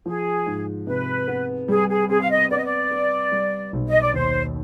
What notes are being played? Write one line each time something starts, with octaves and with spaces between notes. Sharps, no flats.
F3 G#4
G#2
C3 B4
B3
G3 G#4
G#4
C4 G#4
F5
D#5
B3 D5
D#5
D5
B3
G3
B1
D#5
D5
D#2 C5